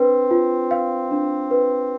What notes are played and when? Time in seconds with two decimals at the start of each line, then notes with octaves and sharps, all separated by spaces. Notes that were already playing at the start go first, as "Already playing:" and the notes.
Already playing: C4 D4 B4
0.31 F4
0.71 F5
1.11 D4
1.51 B4